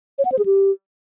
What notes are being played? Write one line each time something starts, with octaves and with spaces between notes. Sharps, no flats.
C#5
F#5
C5
G#4
G4